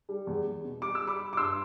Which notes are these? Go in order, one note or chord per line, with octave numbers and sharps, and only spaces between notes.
G3
E2
E2
B2
G3 D6
E6
G3
B5 D6
G3
D6
G2 C6 E6